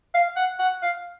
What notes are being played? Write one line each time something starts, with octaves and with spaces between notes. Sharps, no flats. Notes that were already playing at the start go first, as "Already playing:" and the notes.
F5
F#5
F#5
F5